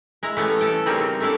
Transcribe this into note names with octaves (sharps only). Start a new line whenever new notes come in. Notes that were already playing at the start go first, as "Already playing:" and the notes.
G#3 E4 A#5
E3 G3 A3 B3 C#4
C#4 A4 G5
C#3 G3 A#3 C4 C#4 D#4
C4
A3 C#4 D4 E4 A4